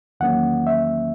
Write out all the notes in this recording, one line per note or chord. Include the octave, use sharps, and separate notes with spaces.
E2 D#3 F#3 A#3 C#4 F#5
E5